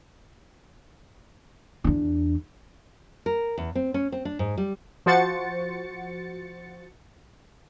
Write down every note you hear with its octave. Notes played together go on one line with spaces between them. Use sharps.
E2 D4
A#4
E2
C4
C#4
C4
D4
G#2
G3
F3 F#4 C5 A6 C#7